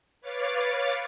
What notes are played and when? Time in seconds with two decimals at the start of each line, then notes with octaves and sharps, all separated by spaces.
0.21 B4 C#5 F5 D6 A6